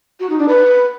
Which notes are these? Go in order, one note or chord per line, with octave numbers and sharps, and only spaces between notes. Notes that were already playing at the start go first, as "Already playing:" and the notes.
F#4
D#4
D4
B4